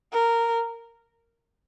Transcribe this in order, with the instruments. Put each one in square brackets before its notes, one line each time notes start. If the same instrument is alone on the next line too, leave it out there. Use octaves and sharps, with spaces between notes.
[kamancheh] A#4